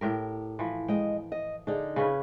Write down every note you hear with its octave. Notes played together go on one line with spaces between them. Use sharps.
A2 G4 A#4
E3 F3
G#3 D#5 G5
D#5
D3 D4 D#4 G#4
C#3 C#4 B4